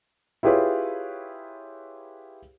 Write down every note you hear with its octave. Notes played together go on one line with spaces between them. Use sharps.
E4 F4 G4 G#4 B4 C#5